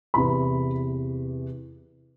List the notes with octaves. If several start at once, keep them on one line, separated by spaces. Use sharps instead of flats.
E2 C3 E3 B5